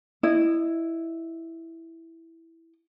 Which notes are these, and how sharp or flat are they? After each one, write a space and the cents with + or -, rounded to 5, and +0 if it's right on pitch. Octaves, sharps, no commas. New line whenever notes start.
E4 +0 D#5 -20